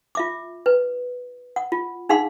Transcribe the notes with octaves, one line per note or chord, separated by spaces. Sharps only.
F4 E5 D6
B4
F#5
F4
D4 D#4 G#4 F5 F#5 C6